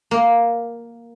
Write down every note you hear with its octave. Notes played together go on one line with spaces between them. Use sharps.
A#3